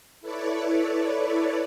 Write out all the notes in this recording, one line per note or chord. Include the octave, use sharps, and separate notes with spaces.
E4 A4 B4 C#5 D5